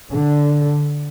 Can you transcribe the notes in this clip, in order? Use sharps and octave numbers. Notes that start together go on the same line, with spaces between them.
D3